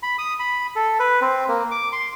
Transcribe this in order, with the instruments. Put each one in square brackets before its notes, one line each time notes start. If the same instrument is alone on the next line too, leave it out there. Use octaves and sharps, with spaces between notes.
[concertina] B5
D#6
B5
A4
B4
C4
A#3
D6
C6